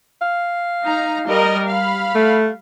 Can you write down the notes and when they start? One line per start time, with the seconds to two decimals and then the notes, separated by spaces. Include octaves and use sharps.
0.22 F5
0.84 D#4 A#5
1.26 G3 A#4 D#5
1.67 F5 B5
2.15 A3